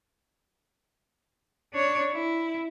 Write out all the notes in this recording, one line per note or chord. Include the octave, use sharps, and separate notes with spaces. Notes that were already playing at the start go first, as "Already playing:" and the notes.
D4 C#5
E4